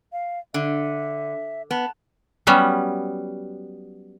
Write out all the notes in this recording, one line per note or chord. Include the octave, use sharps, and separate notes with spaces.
F5
D3 E5
B3 A5
F#3 G3 B3 C#4